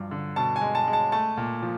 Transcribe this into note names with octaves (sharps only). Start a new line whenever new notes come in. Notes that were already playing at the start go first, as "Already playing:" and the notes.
Already playing: G2 F3 F#3
D3
B2 A5
G#5
G#3
A5
G#3
A5
A3 A5
A#2
F3